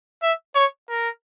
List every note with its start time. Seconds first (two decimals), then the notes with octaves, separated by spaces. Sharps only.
0.23 E5
0.55 C#5
0.89 A#4